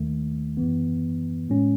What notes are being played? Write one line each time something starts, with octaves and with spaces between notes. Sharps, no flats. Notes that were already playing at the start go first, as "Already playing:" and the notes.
Already playing: D#2 D#3 A3
F#2 E3 B3
A2 G#3 C#4